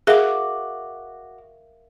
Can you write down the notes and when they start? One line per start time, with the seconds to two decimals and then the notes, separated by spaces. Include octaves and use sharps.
0.07 F#4 G#4 A#4 E5 F5 D6